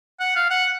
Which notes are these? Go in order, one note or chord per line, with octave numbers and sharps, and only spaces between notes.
F#5
F5
F#5